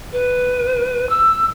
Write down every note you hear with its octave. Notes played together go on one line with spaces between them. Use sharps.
B4
E6